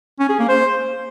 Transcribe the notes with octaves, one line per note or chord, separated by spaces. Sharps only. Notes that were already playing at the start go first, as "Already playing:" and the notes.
C#4
G#4
A#3
C5